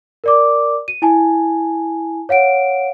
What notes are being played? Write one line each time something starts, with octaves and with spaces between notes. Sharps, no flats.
A#4 D5 D6
D#7
E4 G#5 A5
C#5 F5 F#5 D7